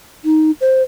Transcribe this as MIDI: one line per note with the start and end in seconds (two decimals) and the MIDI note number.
0.25 0.51 63
0.61 0.82 72